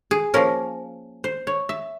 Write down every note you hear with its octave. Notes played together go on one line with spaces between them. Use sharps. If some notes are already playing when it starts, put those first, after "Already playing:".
G#4
F3 A#3 C#4 A#4
C5
C#5
E5